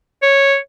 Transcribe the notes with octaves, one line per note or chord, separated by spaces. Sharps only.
C#5